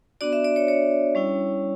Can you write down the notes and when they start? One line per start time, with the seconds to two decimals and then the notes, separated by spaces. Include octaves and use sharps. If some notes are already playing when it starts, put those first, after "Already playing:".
0.21 B3 D4 F#4 D5
0.33 E5
0.45 D5
0.56 C#5
0.68 C#5
1.15 G3 C#4 E4